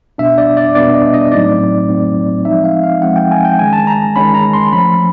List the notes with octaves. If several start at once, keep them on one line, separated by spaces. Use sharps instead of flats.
B2 G3 B3 D4 E5
D5
D5
B2 G3 B3 D4 D5
D#5
D#5
A2 F#3 A3 C4 D#4 D5
A2 F#3 A3 C4 D#4
F3 G#3 C4 D#4 E5
F5
F5
F3 G#3 C4 D#4 F#5
G5
G#5
G5
D#3 G#3 C#4 G#5
A5
A#5
D#3 G#3 C#4 B5
A#5
C6
F3 A3 C#4 B5